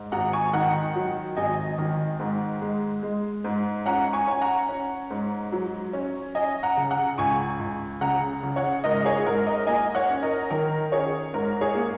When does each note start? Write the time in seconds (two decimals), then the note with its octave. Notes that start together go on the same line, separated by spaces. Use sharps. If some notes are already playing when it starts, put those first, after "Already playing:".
Already playing: G#2
0.12 G#1 F#5 A#5
0.33 G#5 C#6
0.53 D#3 F#5 A#5
0.96 F#3
1.37 G#1 D#5 G#5
1.78 D#3
2.19 G#2
2.61 G#3
3.03 G#3
3.44 G#2
3.86 C#4 F#5 A#5
4.13 G#5 C#6
4.27 C#4 G#5
4.41 F#5 A#5
4.69 C#4
5.10 G#2
5.52 F#3
5.93 C#4
6.35 C#4 D#5 G#5
6.63 F#5 A#5
6.77 C#3
6.90 F#5 A#5
7.18 C#2 G#5 C#6
7.59 C#2
8.01 C#3 F#5 A#5
8.43 C#3
8.56 C#5 F#5
8.84 G#2 A#4 D#5
9.01 D#5
9.05 G#4 C#5
9.26 G#2 A#4
9.47 A#4 D#5
9.67 A#3 D#5 G#5
9.95 C#5 F#5
10.10 C#4
10.22 A#4 D#5
10.50 D#3 A#4
10.92 C#4 G#4 C#5
11.34 G#2 A#4
11.61 G#4 C#5
11.75 A#3